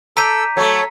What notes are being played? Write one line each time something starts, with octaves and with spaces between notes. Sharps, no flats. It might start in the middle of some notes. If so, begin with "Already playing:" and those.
A4 D5 A#5 E6 G6 B6 D#7
F#3 A3 A4 C#5